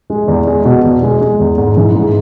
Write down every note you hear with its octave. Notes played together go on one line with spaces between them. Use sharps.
G#3
E2
G#3
B2
E2
G#3
G#3
E2
G#2
E3
G#2